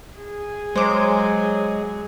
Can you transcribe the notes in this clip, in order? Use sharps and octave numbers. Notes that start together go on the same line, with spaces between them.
G#4
F#3 G#3 C5 D6